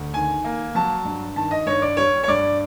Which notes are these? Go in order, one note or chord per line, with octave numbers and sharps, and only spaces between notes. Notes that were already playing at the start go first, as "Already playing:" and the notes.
Already playing: D2
D#3 G#5
A#3
F#3 A5
G2
D#3 A5
D#5
G2 C#5
D5
G3 C#5
C#5
G2 D5